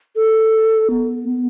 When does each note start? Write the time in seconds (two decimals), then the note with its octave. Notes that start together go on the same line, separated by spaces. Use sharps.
0.16 A4
0.90 B3
1.29 B3